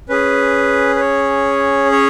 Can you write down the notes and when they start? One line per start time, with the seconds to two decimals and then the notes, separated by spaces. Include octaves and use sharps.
0.09 C#4 G#4 B4
0.96 B4
1.00 C#5
1.92 C#5